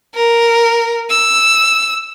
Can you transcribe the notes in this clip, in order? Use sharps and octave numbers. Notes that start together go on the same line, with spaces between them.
A#4
E6